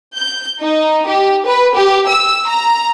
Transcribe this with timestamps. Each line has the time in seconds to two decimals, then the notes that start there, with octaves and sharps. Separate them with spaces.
0.17 G6
0.61 D#4
1.08 G4
1.46 B4
1.75 G4
2.08 E6
2.49 A#5